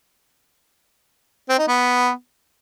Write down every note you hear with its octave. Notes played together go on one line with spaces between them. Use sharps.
C4
D#4
B3